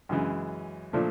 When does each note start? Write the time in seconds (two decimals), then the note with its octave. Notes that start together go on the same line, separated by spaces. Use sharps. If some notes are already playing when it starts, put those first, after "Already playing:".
0.09 F#2 C#3 E3 G#3
0.93 A#2 F3 A3 D4